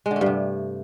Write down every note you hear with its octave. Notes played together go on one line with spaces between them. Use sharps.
G#3
D3
A3
G2
C3